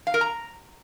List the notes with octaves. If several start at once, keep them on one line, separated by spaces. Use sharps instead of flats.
F5
A#4
A#5